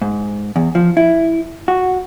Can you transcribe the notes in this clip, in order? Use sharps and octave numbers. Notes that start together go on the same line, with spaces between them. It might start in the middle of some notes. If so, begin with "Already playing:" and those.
G#2
E2
F3
E4
F#4